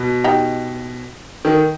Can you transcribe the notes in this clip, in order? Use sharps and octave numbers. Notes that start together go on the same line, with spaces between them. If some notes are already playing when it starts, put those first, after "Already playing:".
Already playing: B2
D#4 G4
D#3